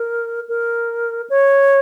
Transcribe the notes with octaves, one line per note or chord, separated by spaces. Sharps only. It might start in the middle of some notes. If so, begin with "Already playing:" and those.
Already playing: A#4
A#4
C#5